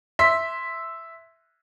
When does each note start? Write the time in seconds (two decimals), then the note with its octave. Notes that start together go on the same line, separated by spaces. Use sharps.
0.19 E5 C6 B6